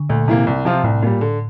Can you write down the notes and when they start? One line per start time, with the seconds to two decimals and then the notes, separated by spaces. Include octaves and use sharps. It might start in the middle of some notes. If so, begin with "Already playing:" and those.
Already playing: D3
0.09 D2 A#2
0.28 C3 E3 A#3
0.47 C2
0.65 C3 F3 C4 F4
0.84 C2 A2
1.02 A#2 G3
1.21 D3